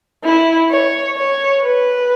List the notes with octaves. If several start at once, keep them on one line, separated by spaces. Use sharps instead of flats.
E4
C#5
C#5
B4